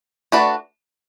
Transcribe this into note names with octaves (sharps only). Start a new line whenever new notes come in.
A3 D4 F#4 B4 D5